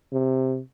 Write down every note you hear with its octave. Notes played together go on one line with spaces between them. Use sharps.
C3